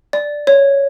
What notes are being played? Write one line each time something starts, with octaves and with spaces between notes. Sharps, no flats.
D5
C#5